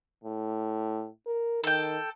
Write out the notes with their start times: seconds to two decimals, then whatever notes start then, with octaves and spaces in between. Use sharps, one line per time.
0.24 A2
1.27 A#4
1.64 D#3 A4 G5